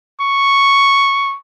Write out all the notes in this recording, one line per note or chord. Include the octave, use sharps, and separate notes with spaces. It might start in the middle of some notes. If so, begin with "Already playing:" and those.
C#6